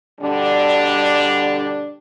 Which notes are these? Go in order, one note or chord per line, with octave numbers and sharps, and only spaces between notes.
B2 D3 G3 D4